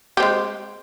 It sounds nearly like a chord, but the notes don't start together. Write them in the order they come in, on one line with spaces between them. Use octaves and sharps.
G4 C4 G#3